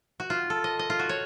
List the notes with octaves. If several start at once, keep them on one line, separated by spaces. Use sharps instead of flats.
F#4
F4
A4
D#5
D#5
F4
F#4
C#5